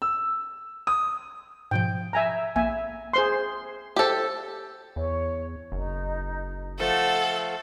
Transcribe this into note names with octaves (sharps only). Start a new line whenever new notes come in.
E6
D#6
G#2 B2 F3 G5
E5 G#5 A#5
A#1 A#3 E5 G#5
G#4 C5 C6
G4 A4 C5 D6
E2 C#5
F#1 D#4
F3 A3 A4 F#5